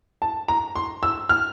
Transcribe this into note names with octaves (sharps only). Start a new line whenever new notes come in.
A5
A#5
C6
E6
F6